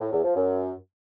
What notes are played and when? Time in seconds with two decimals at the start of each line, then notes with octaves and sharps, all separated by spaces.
0.01 A2
0.12 E2
0.24 F3
0.35 F#2